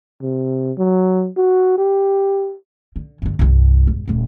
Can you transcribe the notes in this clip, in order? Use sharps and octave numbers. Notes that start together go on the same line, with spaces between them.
C3
F#3
F#4
G4
D3
G2 D3
C2 G2
E1
D#1 D2